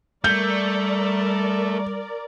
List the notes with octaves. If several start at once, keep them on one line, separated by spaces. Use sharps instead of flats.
G3 A3 A#4 D5 G6